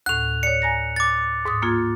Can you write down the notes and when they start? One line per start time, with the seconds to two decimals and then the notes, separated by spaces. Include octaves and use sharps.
0.06 D2 A2 F#6 F7
0.43 C#5 D5 C#7
0.62 G#5 A#5 A#6
0.96 D6 A6
1.45 G#2 C6 D#6
1.62 A#3 F4 G#6